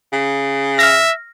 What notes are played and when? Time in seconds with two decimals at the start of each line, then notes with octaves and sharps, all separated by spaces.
0.13 C#3
0.79 E5 F6 A#6